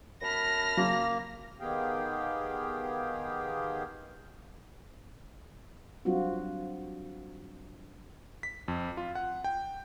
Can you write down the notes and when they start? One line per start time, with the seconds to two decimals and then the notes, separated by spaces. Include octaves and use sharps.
0.22 F#2 A5 B5 F6 A#6
0.77 C#3 F#3 A#3
1.60 D#3 B3 G4 G#4 F5 G5
6.05 F#3 G3 C4 D4 F4 F#4
8.43 B6
8.68 F2
8.97 F4
9.15 F#5
9.44 G5